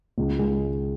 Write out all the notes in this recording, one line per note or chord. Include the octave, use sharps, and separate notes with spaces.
C#2
G#3